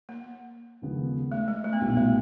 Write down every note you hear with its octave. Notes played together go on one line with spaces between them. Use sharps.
A#3
D#2 C#3 F3 G#3 B3
A3
G#3
A3
B3
B1 A#2 G3 A#3
A3